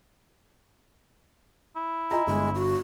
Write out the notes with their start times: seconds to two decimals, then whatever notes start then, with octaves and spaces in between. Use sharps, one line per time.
1.76 E4
2.11 F4 D#5 G#5 A#5
2.27 G1 G#3
2.55 F#4